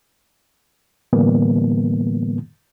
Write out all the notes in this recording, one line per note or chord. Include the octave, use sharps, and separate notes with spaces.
A2 D3 E3 G3 A#3 B3